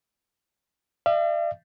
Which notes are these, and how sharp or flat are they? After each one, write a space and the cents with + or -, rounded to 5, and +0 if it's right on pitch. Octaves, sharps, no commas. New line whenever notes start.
D5 +45 F5 -45